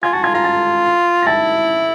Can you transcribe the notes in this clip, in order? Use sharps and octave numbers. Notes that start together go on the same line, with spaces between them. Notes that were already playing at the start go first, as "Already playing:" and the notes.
F4 G#5 G#6
F#4 A5 A6
F4 G#5 G#6
F4 A#5 A#6
A5 A6
A#6
E4 A5 A6